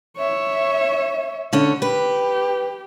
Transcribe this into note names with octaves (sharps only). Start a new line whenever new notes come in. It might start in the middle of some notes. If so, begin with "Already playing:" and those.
C#5 E5
D3 C#4
G4 B4